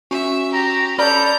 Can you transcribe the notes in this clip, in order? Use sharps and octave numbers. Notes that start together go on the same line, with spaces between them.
C#4 F#4 E5 C#6
G4 A#5
C#4 A4 D5 A#5 B5 G6